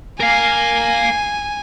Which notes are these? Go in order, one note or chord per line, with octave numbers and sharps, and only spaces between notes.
A#4 F5 G#5